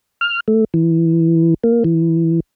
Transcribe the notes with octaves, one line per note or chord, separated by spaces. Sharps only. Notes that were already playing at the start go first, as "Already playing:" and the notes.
F6
A3
E3
A#3
E3